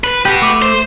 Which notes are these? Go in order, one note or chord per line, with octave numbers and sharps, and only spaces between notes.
B4
F#4 G4 B4
A3 D6
C5